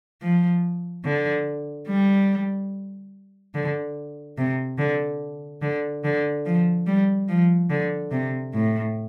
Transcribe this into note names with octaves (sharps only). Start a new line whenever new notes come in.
F3
D3
G3
D3
C3
D3
D3
D3
F3
G3
F3
D3
C3
A2